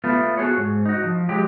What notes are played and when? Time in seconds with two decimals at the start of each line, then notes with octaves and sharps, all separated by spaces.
0.04 A3 B3 F4
0.37 F#4 G#4 A4 C#5
0.57 G#2
0.86 D#4 F#4
1.04 F3
1.29 F#3 G#3 G4